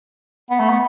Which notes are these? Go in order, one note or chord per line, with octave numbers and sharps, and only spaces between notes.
B3
A3
B3